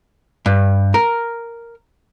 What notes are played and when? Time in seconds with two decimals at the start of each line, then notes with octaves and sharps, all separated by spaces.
0.46 G2
0.94 A#4